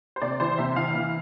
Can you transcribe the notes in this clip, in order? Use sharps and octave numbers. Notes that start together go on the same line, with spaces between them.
C5
C3 D5
E3 C5
C3 E5
E3 F5
E3